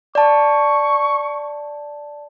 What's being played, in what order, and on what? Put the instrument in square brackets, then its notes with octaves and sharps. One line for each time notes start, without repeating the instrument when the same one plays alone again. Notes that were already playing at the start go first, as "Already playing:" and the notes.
[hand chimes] D5 A5 [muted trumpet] C#6